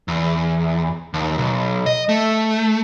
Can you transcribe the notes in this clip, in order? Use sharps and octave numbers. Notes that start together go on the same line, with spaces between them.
E2
D#2
B1
D#5
A3